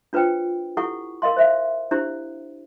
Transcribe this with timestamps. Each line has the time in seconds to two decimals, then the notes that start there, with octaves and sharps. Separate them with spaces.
0.13 D4 F4 B4 C5 G5
0.77 E4 G4 A4 F#5 C#6
1.22 A#4 D#5 F5 C6
1.37 C5 E5 F5
1.91 D4 E4 G4 C5